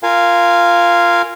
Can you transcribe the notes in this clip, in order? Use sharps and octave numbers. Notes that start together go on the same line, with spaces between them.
F4 A#4 F5 G#5